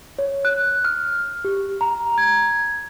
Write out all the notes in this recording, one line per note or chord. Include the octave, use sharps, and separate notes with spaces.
C#5
F#6
F6
G4
A#5
G#6